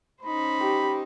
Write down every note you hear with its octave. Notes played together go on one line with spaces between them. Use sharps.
C#4 D#4 C5 B5
G4